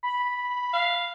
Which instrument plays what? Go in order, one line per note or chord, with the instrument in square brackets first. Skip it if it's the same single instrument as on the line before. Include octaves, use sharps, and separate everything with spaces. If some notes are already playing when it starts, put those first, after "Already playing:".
[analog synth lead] B5
[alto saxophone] F5